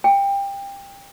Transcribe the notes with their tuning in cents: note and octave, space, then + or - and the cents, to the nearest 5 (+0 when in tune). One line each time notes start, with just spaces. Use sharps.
G5 +25